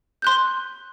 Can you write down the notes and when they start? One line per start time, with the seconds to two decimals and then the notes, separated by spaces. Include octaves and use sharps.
0.22 C6 F#6 G6